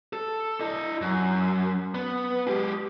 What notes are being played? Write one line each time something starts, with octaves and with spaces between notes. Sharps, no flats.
A4
E4 D#5
F#2
B3
G#3 G4